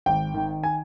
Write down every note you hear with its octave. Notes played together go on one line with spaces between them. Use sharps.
G#1 G5
D#3
G#5